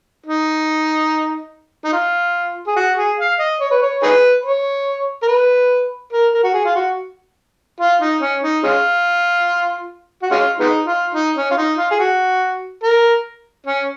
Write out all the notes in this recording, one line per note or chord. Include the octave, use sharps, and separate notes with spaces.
D#4
D#4
F4
G#4
F#4
G#4
F5
D#5
C#5
B4
C#5
D#4 G#4 B4
C#5
A#4
B4
A#4
A#4
F#4
G#4
F4
F#4
F4
D#4
C#4
D#4
G#3 C#4 F4
F#4
G#3 C#4 F4
G#3 B3 D#4
F4
D#4
C#4
F4
D#4
F4
G#4
F#4
A#4
C#4